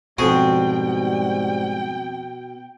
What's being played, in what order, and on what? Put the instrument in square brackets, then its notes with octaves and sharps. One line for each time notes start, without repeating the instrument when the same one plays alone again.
[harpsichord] F2 F#4 G#4 [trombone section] G#2 G3 [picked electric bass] B2 [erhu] G5